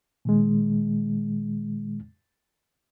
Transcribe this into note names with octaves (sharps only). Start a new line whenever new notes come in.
A#2 D#3 G#3